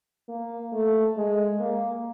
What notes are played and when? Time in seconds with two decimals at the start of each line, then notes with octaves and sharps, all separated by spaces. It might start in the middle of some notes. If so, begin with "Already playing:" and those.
0.29 A#3
0.73 A3
1.17 G#3
1.60 A#3